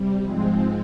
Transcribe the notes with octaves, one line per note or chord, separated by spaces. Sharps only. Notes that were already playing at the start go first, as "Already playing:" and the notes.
Already playing: C3 G3
G#2 F3 G#3 C4